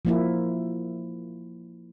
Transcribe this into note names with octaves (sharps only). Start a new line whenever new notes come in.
F3 A#3 E4